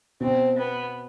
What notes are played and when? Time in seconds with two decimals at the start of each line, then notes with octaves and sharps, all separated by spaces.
0.20 B2 C4
0.58 B3